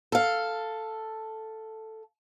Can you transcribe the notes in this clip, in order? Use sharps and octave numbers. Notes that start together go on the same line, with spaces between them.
A4 F5